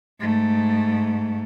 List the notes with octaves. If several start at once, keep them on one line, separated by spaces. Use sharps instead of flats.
G#2 A3